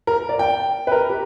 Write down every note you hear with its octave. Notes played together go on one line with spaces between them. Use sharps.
A#4
D5
G5
B4
A#4
G4